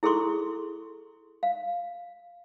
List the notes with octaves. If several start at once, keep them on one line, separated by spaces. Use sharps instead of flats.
E4 G#4 A4 C6 C#6
F5